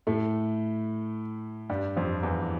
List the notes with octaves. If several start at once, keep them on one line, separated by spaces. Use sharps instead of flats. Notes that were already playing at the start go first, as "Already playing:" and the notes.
A2 A3
G2 G3
F2 F3
E2 E3